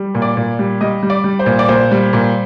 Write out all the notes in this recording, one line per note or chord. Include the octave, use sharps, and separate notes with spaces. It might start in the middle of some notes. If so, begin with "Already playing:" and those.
Already playing: G3
A#2
D5
A#2
G3
G3 D#5
G3
D5
G3
C5
A#2
D5
A#2 C5
G3
A#2